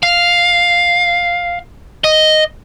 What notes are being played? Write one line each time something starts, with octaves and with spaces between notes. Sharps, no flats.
F5
D#5